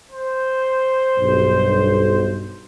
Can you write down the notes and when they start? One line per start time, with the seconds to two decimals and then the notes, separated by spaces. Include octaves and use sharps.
0.12 C5
1.18 B1 G2